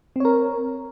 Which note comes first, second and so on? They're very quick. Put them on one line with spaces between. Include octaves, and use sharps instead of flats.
C4 C#5 A#4